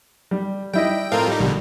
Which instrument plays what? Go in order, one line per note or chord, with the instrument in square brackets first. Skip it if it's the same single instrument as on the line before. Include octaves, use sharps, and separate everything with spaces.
[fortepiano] G3
[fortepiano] G3 E4 D#5 [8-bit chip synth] G5
[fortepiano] A2 [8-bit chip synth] C4 F4 A#4
[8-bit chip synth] G3 D#4
[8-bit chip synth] A#1 B2 D3 [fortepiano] G3